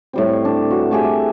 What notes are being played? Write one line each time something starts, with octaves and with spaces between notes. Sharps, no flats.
A2 G3 C4
D4
E3 F#4
A3 G4 G#4 E5
E5